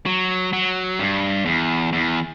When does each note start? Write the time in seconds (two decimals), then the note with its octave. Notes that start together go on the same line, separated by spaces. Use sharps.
0.06 F#3
0.53 F#3
0.99 G2
1.45 E2
1.93 E2